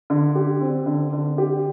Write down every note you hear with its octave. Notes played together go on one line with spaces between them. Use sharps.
D3
G4
C4
D3
D3
G4